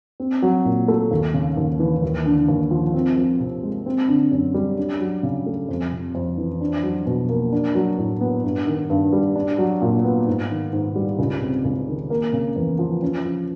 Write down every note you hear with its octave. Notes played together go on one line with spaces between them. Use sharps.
C4
F#3
A#2
A3
D#2
C#3
D#2
E3
D#2
D3
D#2
F3
C4
F3
C3
G#3
C4
D3
F#2
G3
D4
F#3
C#3
A3
F2
C3
F2
E3
D4
F#3
B2
A#3
D4
F#3
A2
B3
G2
D#3
G2
G3
D4
F#3
A#2
B3
G#2
D#3
G#2
G3
C#2
C3
C#2
D#3
A#3
C#3
E2
F3
C#4
F3